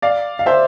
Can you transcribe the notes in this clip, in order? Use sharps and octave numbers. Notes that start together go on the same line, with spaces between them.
D5 F5
F5
C5 E5